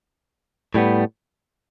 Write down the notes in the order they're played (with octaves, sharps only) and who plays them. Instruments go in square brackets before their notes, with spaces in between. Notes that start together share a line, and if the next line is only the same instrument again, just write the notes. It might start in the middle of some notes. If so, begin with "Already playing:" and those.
[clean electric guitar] A2 G3 B3